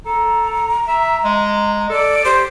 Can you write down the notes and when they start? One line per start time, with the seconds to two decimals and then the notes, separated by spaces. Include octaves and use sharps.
0.06 A4 A#5
0.87 E5
1.24 G#3
1.89 A4 D5
2.24 G4 C5